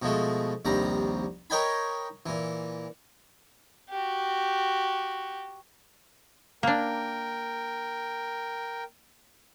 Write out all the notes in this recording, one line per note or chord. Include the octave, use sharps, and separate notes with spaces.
B2 F3 G#3 A3
A#1 D#2 C3 G3 A#5
A#4 C#5 D#5 G5 G#5 B5
A#2 E3
F#4 G4
A#3 D4 A#4 G5